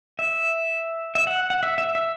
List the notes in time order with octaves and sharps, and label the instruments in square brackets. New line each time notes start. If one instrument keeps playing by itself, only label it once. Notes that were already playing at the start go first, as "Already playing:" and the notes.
[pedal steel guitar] E5
E5
F#5
F#5
E5
E5
E5